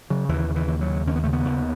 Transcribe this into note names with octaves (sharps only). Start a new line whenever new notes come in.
C#3 F#3
D#2 E3
C#3
E3
D#2
F#3
C#3
D#2 C#4
B3
C#3 A3
B3
D#2